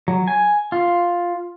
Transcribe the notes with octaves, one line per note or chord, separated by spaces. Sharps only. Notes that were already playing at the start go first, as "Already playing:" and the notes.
F#3
G#5
F4